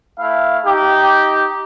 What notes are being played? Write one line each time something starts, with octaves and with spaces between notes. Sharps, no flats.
A3 E4 F5
D#4 G4